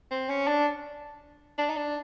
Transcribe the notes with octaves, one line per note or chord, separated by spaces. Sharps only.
C4
C#4
D4
D4
D#4
D4